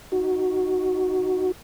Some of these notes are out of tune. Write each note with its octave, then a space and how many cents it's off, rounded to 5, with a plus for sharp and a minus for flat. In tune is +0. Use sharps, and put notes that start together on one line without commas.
D#4 +0 F#4 +0